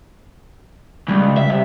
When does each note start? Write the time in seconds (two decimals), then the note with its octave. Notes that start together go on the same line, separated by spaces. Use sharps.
1.08 C#2 G3
1.38 E5
1.50 C3 E5